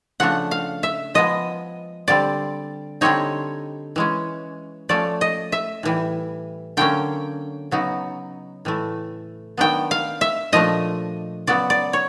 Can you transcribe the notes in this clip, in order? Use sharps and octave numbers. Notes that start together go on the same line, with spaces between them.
C#3 F3 A3 D4 F#5
F5
E5
F3 G#3 B3 D#5
D3 G3 C4 D5
D3 G3 C4 D#4 C#5
E3 G#3 C#4
F3 A3 C#4 D5
D#5
E5
A2 E3 G3
D3 F#3 A#3 C#4 G5
C#3 F#3 B3 D#4
A2 E3 A3
D#3 F#3 B3 D4 G5
F5
E5
A#2 F3 A3 D4 D#5
C#3 F#3 B3 D5
D5
C#5